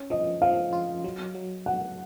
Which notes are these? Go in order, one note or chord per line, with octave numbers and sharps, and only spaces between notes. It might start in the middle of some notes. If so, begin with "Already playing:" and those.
Already playing: C#4
F3 D#5
F3 F5
F4
F#3
F#3
F#3 F#5